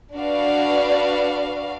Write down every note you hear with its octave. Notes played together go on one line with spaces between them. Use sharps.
D4 F#4 B4 D5 F5